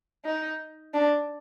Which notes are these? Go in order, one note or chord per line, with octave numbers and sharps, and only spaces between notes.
D#4
D4